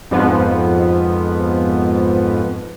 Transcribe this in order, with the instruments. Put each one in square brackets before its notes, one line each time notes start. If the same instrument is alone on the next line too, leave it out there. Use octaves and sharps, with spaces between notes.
[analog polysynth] F2 G#2 F3 B3